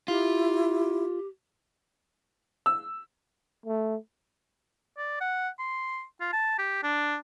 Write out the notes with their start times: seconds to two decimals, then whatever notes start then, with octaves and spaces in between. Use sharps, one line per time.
0.08 E4 F4 G4
2.66 E6
3.66 A3
4.98 D5
5.21 F#5
5.59 C6
6.21 F4
6.33 A5
6.59 G4
6.83 D4